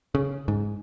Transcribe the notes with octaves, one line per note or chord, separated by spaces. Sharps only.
C#3
G#2